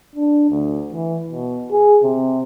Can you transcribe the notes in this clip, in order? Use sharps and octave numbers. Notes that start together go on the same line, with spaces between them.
D4
D2
E3
B2
G#4
C3